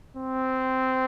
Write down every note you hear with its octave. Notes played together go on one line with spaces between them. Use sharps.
C4